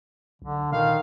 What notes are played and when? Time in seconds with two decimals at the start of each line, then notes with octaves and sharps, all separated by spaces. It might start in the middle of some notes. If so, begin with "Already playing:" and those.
0.42 B1 D3
0.72 A#2 D#3 F5